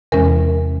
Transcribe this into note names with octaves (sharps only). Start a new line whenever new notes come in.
E2 C3 E3 G#3 C#4 A#4